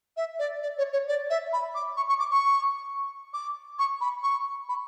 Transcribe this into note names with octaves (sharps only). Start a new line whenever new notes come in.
E5
D5
D5
C#5
C#5
D5
E5
B5
D6
C#6
C#6
D6
C#6
D6
C#6
B5
C#6
B5